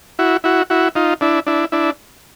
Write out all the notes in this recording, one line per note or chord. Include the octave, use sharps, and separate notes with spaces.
E4 F#4
E4 F#4
E4 F#4
D#4 F4
D4 E4
D4 E4
D4 E4